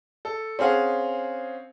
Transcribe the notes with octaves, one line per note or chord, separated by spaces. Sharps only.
A4
C4 C#4 G#4 F5 F#5